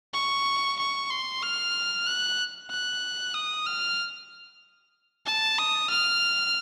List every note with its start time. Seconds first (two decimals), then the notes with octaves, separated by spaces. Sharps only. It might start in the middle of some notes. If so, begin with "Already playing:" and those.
0.14 C#6
0.79 C#6
1.10 C6
1.43 F6
2.07 F#6
2.71 F#6
3.34 D#6
3.66 F6
5.26 A5
5.59 D#6
5.90 F6